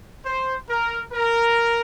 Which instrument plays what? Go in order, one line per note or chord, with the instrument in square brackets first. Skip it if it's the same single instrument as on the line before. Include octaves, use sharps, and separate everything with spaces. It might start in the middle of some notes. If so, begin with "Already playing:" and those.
[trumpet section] C5
A#4
A#4